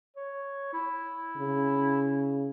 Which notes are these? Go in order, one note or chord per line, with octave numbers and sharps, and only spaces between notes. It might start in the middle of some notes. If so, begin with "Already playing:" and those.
C#5
E4
C#3